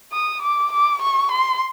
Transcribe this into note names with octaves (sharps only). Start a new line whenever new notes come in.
D#6
D6
D6
C#6
C6